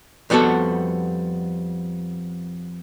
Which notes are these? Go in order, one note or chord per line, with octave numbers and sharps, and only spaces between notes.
F2 G3 B3 F#4 A4